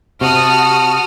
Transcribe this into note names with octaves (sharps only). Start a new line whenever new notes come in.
C3 F#4 A5 D#6 F6